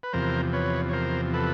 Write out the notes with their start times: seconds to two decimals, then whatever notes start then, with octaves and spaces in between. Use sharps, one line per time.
0.03 B4
0.13 E2 C3 F3 A#4 C5
0.53 B4 C#5
0.89 C#5
0.93 A#4 C5
1.33 A4 B4